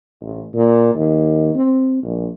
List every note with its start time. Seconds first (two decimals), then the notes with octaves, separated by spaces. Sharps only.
0.21 A1
0.54 A#2
0.95 D#2
1.54 C4
2.03 A#1